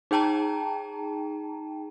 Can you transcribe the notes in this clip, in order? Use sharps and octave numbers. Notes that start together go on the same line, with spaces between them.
D#4 G#4 G5 A5 A#5